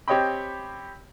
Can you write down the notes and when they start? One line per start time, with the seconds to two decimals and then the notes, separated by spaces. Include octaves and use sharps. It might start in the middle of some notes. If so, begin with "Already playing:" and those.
0.08 C4 G4 C#5 D#5 G5 B5